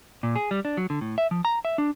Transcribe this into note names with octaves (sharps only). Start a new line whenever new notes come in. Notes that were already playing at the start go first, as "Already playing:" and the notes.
A#2
G#4
G3
D4
F#3
D3
A2
E5
F3
A#5
E5
D4